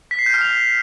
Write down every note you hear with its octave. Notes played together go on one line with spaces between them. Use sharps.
B6
C7
G6
F6
F7